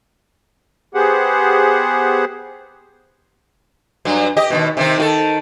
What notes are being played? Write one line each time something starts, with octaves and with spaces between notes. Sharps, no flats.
B3 G4 G#4 C5 F#5
G2 F#3
G4 D#5
D#2 G#2 B2
C3 D#3 C4
D#3 F4 A4